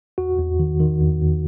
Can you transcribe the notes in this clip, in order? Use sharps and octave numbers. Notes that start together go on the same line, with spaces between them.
E2 F#4
E2
D#3
D#3
E2
E2